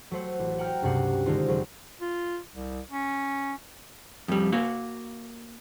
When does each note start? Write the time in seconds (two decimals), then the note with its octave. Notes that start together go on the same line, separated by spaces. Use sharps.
0.11 F#3 A3 C5 F#5
0.39 A1
0.58 F#5 G5 A#5 F6 G6
0.82 C#2 G2 C3 F#5 C7
1.26 D3 D#3 G#3 D#4 F4 C5
1.48 F#1 F#3 C5
2.01 F4
2.54 C2
2.91 C#4
4.28 F2 G3
4.52 A#3 F#4 F5